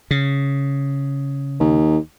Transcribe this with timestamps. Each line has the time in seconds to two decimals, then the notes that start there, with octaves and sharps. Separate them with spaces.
0.11 C#3
1.60 D#2